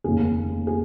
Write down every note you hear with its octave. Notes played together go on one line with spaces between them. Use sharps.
F1 D#2 C#3 G#4
G#4